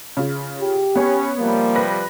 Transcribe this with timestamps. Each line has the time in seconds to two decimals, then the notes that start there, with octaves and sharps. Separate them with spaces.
0.17 C#3 F4
0.61 G4
0.95 B3 C#4 C#5
1.39 C3 F3 G3 A#3
1.75 B4 A#6